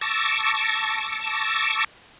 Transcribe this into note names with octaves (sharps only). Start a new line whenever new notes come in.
A5 C#6 D6 E6 A#6